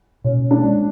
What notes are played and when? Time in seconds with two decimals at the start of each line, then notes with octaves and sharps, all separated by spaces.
0.24 B2 C#4
0.51 D4
0.64 G#3 C#4